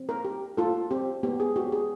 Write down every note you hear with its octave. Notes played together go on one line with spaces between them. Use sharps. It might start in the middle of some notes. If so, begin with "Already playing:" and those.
Already playing: C4
A#4
G4
F4 A4
C4 G4
B3 G4
G#4
F#4 G4
G#4